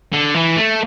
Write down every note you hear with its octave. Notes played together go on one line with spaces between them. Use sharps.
D3
E3
A3